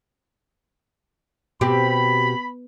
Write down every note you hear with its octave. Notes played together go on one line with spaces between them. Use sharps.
B2 C4 G4 B5